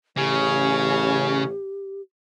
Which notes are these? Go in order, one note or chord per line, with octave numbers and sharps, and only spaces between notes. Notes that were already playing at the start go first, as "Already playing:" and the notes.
A1 C#3 C#4 G4